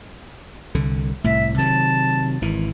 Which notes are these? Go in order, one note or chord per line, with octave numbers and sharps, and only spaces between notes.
C2 D3
C2 A2 E5
C3 D#3 F#3 A5
G#1 E3